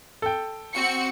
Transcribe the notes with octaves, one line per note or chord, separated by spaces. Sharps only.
A4 G5
C4 F#4 C#7